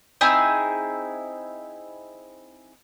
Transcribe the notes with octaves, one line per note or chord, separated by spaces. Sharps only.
C4 D#4 E4 G#4